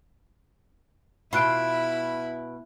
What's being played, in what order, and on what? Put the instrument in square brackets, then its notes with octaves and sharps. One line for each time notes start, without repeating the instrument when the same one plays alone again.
[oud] B2 F4 [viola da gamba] E4 [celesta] B5 F#6 D7